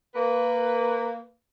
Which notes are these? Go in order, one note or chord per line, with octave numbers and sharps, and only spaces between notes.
A#3 B4